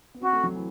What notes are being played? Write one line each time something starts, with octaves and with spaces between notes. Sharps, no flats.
B3
C4 F#4
A3
F#3
E3